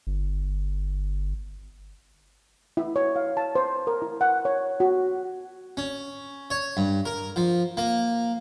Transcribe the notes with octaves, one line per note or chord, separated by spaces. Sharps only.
G1
E4
C#5
F5
A5
C5
A#4
E4
F#5
C#5
F#4
C#4
C#5
G2
A#4
F3
A#3